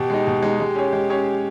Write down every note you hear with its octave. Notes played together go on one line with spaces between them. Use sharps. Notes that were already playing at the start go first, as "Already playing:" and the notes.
Already playing: B2 G4
G#3 D#4
B2
G#3 D#4
G#3 G4
C#4 G#4 C#5
G#3
C#4 G#4 C#5